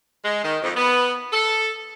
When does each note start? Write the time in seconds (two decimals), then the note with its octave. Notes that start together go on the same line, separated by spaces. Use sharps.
0.25 G#3
0.44 D#3
0.63 F2
0.77 B3
1.33 A4